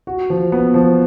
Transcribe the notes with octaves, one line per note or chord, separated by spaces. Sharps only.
F#4
F3
B3
F3